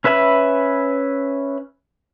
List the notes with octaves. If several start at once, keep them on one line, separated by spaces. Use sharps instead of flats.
C#4 B4 E5 G#5 B5